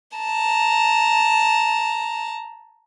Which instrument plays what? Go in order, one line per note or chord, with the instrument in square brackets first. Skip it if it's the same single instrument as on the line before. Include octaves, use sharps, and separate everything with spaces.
[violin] A5 A#5